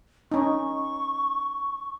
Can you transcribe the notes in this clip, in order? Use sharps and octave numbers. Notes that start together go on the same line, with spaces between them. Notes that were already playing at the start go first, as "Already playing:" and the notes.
C#4 D#4 C#6